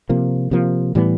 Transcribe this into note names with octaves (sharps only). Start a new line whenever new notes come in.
C3 F3 A#3
C3 F3 A#3
A2 E3 G3 B3